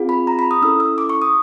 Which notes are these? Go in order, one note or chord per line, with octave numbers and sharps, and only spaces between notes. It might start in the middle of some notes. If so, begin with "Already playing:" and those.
Already playing: C4 F4 G#4
B5
A#5
B5
D#6
C#4 E4 A4 E6
E6
D6
C#6
D#6